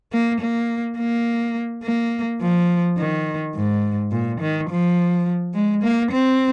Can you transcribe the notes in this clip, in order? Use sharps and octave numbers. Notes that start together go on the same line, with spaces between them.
A#3
A#3
A#3
A#3
F3
D#3
G#2
A#2
D#3
F3
G#3
A#3
C4